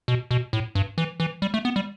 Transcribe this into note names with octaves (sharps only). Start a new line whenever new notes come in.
B2
B2
A2
G2
E3
E3
G3
A3
B3
G3